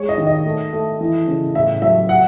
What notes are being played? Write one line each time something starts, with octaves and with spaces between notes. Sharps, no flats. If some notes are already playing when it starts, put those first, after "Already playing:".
Already playing: G#3 C#5
D#5
D#3
D#5
A3
A3
E3
C#3
A2 E5
F#3 E5
F#5